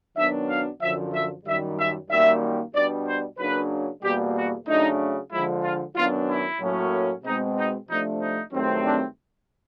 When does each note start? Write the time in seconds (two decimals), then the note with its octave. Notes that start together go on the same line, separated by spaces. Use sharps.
0.17 F#2 D#3 F#3 B3 D4 E5
0.49 F5
0.81 F#2 D3 F3 E5
1.13 E5
1.45 F#2 D#3 G3 E5
1.78 E5
2.10 F#2 D#3 G3 A#3 E5
2.74 B2 G3 B3 D4 D5
3.06 C5
3.38 C#3 F#3 A#3 D4 B4
4.03 E2 B2 G3 A#3 G4
4.35 F#4
4.67 C#3 F#3 A3 D4 D#4
5.32 D3 F3 G#3 E4
5.63 F4
5.95 F#2 D#3 F#3 B3 D4 F4
6.28 E4
6.61 A2 F#3 A#3 C#4
7.24 B2 G#3 C4 D#4
7.57 D#4
7.88 C3 F3 A3 D4 D#4
8.20 D#4
8.53 G2 D#3 F#3 A3 C4
8.85 D4